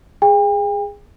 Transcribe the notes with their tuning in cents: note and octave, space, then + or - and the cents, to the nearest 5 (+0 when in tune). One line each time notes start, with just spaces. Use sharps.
G#4 -10 G5 +40